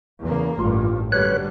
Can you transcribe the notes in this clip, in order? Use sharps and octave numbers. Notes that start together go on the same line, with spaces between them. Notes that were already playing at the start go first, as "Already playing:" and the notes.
E2 C#3 A#3
A1 G2 F4
F#2 D3 G3 B4 C#5 F#6